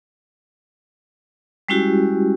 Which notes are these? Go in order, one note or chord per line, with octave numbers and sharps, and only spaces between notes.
G3 G#3 C#4 E4 F#4 G4